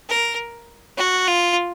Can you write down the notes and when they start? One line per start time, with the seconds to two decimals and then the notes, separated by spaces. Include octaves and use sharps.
0.09 A#4
0.97 F#4
1.27 F4